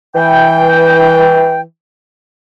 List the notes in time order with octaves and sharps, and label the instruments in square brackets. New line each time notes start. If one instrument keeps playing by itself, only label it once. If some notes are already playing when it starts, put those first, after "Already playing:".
[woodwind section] E3 G5